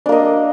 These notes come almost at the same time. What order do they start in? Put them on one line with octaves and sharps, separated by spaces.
D4 A#3 D#5